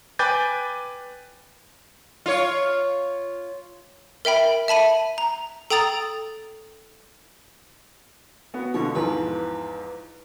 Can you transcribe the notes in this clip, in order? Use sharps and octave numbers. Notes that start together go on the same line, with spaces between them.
B4 G5 G#5 D6 G6 A6
F4 C#5
A#4 E5 G5 B5
E5 A5 B5 D#7
A#5
A4 G5 A#5 D#6 A6
B3 F#4
B2 D3 F3 C#5
E2 G#2 F3 B4